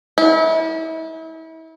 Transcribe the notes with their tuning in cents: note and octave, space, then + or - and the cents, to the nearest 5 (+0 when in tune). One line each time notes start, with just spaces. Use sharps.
E4 -35